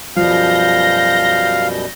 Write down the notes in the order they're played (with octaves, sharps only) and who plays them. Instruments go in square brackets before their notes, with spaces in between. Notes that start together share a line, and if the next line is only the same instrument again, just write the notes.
[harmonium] F#2 B2 G3 [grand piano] F3 [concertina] F5 [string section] G6 A#6